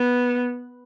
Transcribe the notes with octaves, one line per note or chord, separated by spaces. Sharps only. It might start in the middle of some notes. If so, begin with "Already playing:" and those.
Already playing: B3